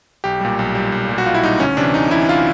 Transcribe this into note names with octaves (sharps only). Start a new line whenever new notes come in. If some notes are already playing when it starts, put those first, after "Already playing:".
B1 G4
A#2 G3
B1
A#2 G3
B1
A#2 G3
F#4
B1 F4
E4
A#2 G3 D#4
D2 C#4
C3 E3 D4
D2 D#4
C3 E3 E4
F4